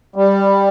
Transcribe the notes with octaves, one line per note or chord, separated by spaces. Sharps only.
G3